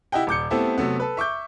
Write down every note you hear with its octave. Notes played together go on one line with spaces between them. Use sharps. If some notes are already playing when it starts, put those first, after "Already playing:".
E4 G4 D#5 F#5 G5
D#1 D6 G6 C#7
A3 B3 C4 E4 G4 A4
C3 F#3 A3 B3
A4 B4
E5 C#6 D6 G6